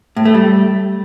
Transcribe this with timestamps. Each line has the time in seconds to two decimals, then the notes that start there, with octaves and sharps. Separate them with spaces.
0.16 A2
0.25 A3
0.34 G3